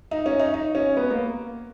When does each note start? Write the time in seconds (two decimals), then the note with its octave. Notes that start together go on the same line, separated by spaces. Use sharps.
0.11 D#4
0.26 C#4
0.39 D#4
0.54 D#4
0.75 C#4
0.97 B3
1.11 A#3